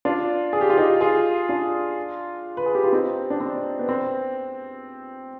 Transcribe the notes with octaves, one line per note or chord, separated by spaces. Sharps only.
D4 F4
G#4
G4
F4
D#4 G4
F4 G#4
D4 F4
B4
G#4
G4
F4
C4 D#4
D4
C4
B3
C4